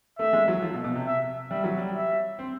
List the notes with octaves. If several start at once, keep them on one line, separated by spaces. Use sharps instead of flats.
A3 E5
G#3
F#3
F3
B2
B2
C3
E5
G3 E5
F#3
G3
E5
C4